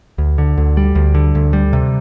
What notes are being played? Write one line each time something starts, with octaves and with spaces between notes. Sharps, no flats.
D2
D3
D2
G3
D2
D3
D2
G3
C3